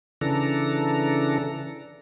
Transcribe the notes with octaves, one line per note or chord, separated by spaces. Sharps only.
C#3 E3 D4 A4 A#5